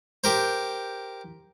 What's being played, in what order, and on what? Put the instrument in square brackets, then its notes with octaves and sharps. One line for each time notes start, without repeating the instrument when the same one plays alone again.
[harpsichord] G4 A#4 C5